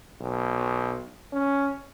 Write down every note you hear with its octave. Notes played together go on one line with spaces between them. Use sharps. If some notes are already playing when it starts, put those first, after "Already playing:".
B1
C#4